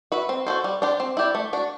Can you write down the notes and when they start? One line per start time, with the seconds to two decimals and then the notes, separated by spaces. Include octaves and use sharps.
0.12 F#4 B4 E5
0.29 C4
0.47 F#4 A4 C5
0.64 G3
0.82 D4 G4 C5
1.00 C4
1.17 E4 G4 D5
1.35 A3
1.53 D4 F#4